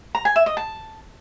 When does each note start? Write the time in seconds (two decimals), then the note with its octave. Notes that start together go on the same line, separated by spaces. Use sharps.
0.15 A#5
0.25 G#5
0.36 E5
0.46 D#5
0.57 A5